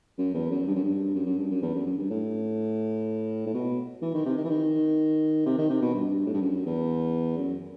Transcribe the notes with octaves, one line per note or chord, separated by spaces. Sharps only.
F#2
E2
F#2
G2
F#2
G2
F#2
F#2
G2
F#2
E2
F#2
F#2
G2
A2
A2
B2
E3
D#3
C3
D#3
E3
D#3
C3
D#3
C3
B2
G2
A2
G2
F#2
E2
F#2